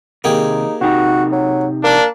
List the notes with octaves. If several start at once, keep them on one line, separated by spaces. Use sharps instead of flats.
C3 D#3 A#3 D#4 G4 G#4
C3 D#4 F#4 G5
F#3
A#3 D4